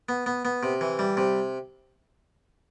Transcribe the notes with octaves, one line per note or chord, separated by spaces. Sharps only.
B3
B3
B3
C3
E3
G3
C3